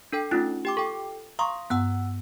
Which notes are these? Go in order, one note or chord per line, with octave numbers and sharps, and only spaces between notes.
D4 A4 G5
A3 C#4 D#4 F4 F#6 A6
G4 G5 D6
A4 G5 C#6
F5 A#5 C6 C#6 D#6
G2 B3 F#5 E6 F#6